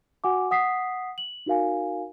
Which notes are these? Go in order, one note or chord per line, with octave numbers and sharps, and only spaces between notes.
F#4 F#5 G#5 D6
F#5 D#6 B6 C7
F#7
D#4 F#4 A#4 F5 G#5